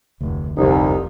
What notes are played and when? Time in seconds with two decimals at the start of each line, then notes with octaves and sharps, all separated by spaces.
0.21 F1 D2
0.57 F1 C2 F3 D#4